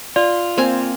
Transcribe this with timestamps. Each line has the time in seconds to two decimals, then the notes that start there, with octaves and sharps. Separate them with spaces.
0.16 F4 D5
0.57 A#3 C4 G#5